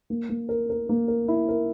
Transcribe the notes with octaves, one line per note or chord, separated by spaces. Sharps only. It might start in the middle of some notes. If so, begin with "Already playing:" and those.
A#3
A#3
A#4
A#4
A#3
A#4
E4
A#4